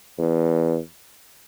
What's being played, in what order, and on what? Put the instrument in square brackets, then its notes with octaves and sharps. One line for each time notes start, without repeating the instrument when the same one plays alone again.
[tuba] E2